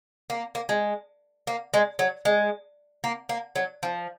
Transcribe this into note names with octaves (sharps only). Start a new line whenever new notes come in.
A#3
A#3
G#3
A#3
G#3
F#3
G#3
A#3
A#3
F#3
F3